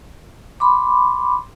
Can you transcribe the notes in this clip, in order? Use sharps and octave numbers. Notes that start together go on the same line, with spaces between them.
B5 C6 D6